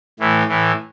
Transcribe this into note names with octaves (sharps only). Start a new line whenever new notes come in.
A2 E3
A2 E3